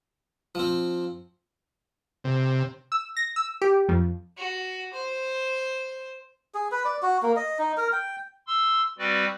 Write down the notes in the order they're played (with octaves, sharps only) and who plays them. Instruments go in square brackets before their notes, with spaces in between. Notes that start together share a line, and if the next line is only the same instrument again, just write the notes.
[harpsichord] F3 C4
[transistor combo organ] C3
[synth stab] E6
A#6
E6
G4
F2
[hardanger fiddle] F#4
C5
[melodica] G#4
B4
D5
F#4
A#3
D#5
D#4
A#4
G5
[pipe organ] C6 E6
G3 C4 F#4 B4 D5